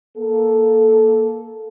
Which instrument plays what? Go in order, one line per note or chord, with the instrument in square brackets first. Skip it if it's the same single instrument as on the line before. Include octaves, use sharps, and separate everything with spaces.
[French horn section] A#3 A4